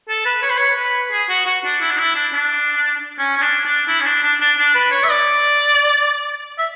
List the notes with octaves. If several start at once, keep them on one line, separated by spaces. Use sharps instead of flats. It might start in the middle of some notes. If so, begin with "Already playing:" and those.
A4
B4
C#5
B4
C#5
B4
G#4
F#4
F#4
D4
E4
D4
E4
D4
D4
C#4
C#4
D4
D4
E4
C#4
D4
D4
D4
D4
B4
C#5
E5
D5
E5